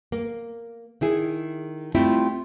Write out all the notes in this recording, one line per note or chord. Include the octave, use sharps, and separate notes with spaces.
A#3
D#3 E4 G#4
G3 A3 C4 E4 F4